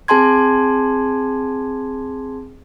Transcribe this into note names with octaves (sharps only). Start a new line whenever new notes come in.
C4 G#4 G#5 A5 C6 G#6